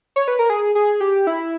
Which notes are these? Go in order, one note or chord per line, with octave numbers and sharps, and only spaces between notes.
C#5
B4
A#4
G#4
G#4
G4
E4